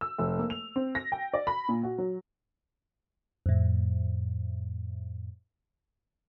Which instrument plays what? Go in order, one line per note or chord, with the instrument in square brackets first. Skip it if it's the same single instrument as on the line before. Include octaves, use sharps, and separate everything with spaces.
[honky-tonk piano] E6
F1
A#3
F7
C4
A#6
G5
D5
B5
A#2
F#4
F#3
[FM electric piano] F2 A2